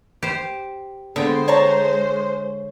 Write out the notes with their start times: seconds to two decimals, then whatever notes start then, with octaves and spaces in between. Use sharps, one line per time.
0.23 G4 C5
1.16 D3 G#3 B3 C5 G5
1.48 C#5 A5 A#5